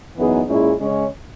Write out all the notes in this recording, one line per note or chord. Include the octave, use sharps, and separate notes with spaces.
F#2 E3 B3 D#4 G#4
A#2 G#3 C#4 E4 G#4
C#3 G#3 C#4